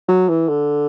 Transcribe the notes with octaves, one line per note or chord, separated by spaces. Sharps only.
F#3
E3
D3